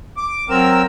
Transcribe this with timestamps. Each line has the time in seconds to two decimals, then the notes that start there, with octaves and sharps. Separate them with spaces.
0.17 D6
0.50 F#3 C4 A#4 E6